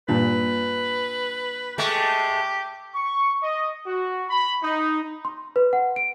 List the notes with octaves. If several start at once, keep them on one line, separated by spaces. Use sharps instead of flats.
G2 A#2 B4
G#3 A3 G4
C#6
D#5
F#4
B5
D#4
C6
B4
F#5
D7